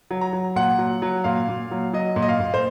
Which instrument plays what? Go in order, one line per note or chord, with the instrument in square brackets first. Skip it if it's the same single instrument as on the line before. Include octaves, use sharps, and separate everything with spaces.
[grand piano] F#3
A#5
F#3
A#2 F#5
F#3
F#3
A#2 F5
A#2
F#3
F#3 D#5
A#2
D#5
F5
A#2
C5